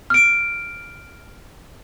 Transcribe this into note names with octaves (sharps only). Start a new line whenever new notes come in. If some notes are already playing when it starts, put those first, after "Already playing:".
F6 D7